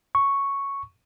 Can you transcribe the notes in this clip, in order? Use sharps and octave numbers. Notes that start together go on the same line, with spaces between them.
C#6